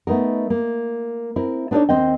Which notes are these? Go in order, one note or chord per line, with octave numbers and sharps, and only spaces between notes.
A3 B3 D#4 A#4
A#3
C4 E4 A#4
B3 D4 D#4 A4 C#5 D5
D#2 C4 D#5 G5